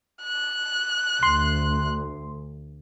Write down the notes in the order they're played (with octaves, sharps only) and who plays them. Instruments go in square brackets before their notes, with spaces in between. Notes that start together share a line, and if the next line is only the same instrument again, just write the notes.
[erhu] F#6
[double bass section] D2 [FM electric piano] C6